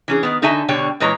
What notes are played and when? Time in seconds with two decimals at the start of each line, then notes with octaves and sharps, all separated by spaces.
0.08 E3 C#4 G#4
0.23 D#3 B3
0.42 D3 D#4 F#4 A4 E5 G#5
0.68 B2 D3 G3 C#5 G5
1.00 A#2 E3 G#3 B4 C#5 A#5